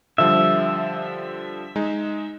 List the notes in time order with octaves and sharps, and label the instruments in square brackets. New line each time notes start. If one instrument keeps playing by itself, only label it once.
[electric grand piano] D3 F3 G3 [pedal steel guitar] E5
[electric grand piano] G#3 D#4